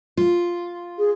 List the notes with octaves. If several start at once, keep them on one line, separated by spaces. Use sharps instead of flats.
F4
G#4